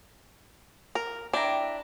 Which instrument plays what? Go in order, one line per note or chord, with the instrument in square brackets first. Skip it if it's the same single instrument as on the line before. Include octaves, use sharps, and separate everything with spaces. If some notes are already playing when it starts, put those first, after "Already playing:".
[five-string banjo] A#4
[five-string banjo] D4 [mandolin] E4 G5 A#5